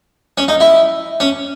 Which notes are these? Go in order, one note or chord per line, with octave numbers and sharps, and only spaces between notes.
C#4
D#4
E4
C#4